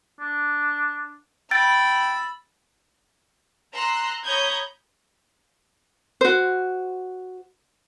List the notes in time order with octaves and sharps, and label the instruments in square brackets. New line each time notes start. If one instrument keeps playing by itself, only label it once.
[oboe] D4
[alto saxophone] G5 [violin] B5 [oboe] E6 [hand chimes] A6
[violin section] A#5 C6 E6 F#6
C#5 A#5 B5 D#6 G6 G#6
[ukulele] F#4 C5